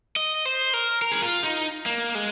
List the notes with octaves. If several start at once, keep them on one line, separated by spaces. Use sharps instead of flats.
D#5
C5
A#4
A#4
G#4
F4
D#4
A#3
G#3